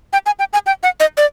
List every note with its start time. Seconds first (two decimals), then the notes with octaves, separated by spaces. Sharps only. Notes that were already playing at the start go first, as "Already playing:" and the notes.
0.13 G5
0.26 G#5
0.39 G5
0.53 G#5
0.66 G5
0.83 F#5
1.00 D#5
1.17 D5